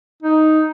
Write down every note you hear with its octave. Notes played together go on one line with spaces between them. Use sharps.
D#4